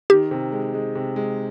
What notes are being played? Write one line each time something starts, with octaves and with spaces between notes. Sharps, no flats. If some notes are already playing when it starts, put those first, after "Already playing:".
D#3 G4
C3
G#3
G#3
C3
G#3